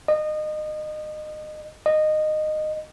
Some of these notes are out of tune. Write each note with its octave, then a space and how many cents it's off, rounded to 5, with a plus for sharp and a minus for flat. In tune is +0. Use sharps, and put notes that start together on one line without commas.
D#5 -25
D#5 -15